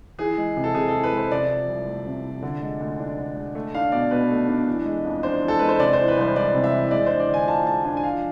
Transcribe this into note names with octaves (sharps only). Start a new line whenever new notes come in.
E3 G#4
G#3
C3
A4
C3 G#4
A4
E3
B4
G#3
C5
C3 D5
F3
C2
A3
C3
F3
D3
G#3
D2
D4
D3
G#3
A3
D4 F5
B2 D5
B2 B4
A3
D4
E3
G#3
F2
D4 C5
E3
A4
G#3 B4
C5
C3 D5
E3 C5
B4
C2 C5
G#3 D5
C3
E5
E3
G#3 D5
D4 C5
D5
D3 G#5
F4 A5
G#3 A5
D4 G#5
G#5
F3 F5